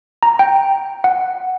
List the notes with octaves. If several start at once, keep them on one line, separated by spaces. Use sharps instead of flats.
A#5
G5
F#5